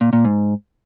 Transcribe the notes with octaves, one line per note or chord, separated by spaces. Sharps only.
A#2
A#2
G#2